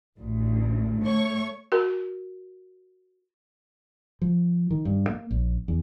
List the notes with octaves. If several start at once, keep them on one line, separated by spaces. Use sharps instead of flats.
A1 D2
A3 C#5 C#6
F#4 A#4
F3
D#3
G2
A#3
A#1
E2